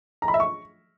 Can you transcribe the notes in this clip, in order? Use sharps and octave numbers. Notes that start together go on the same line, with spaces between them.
A#5
B5
E5
C#6